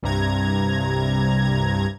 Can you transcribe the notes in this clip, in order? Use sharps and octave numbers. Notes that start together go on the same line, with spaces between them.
C2 G2 C3 A#5 G#6